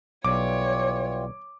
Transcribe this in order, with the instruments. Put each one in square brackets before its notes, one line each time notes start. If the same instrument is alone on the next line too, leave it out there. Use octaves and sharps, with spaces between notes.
[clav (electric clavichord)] B1 [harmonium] E3 G3 F4 [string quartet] C#5 [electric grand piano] D6